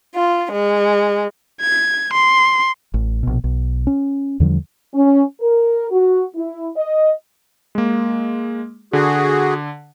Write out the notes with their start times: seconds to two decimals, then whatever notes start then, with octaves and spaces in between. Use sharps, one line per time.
0.16 F4
0.52 G#3
1.61 G#6
2.13 C6
2.94 A1
3.23 A#1 B2
3.44 B1
3.87 C#4
4.40 E2 D3 F3 G3
4.93 C#4
5.40 A#4
5.90 F#4
6.35 E4
6.76 D#5
7.75 G#3 A#3
8.93 D3 F#4 G#4